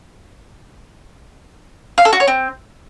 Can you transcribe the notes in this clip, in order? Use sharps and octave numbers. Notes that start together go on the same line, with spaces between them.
F5
A4
F#4
C#5
C4